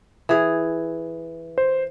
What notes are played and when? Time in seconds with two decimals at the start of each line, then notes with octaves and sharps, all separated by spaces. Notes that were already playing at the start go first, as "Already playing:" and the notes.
0.29 E3 G#4
1.58 C5